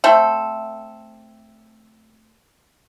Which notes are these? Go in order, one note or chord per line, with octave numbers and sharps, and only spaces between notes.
A3 C4 A4